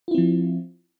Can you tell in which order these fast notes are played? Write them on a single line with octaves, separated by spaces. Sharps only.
F4 E4 C4 F3